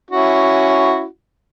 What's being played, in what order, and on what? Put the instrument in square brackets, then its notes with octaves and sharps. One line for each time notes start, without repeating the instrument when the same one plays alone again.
[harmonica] C#4 E4 F#4